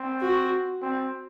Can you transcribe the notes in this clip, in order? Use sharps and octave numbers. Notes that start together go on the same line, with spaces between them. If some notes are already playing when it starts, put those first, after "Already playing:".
Already playing: C4
F#4
C4